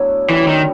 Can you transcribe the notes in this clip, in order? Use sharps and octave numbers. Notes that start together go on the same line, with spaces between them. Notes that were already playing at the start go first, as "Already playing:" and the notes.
Already playing: F#3 A3 B3 D4 E4
F#2 D3 E3 G3
D#3